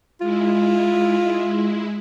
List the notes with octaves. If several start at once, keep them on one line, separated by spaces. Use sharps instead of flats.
G#3 E4 F4